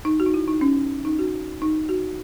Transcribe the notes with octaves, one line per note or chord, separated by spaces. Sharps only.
D#4
F#4
D#4
E4
D#4
C#4
D#4
F#4
D#4
F#4